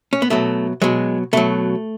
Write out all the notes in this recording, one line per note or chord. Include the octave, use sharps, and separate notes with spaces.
C#4
B3
B2 F#3 A3
B2 F#3 G#3
B2 F#3 A3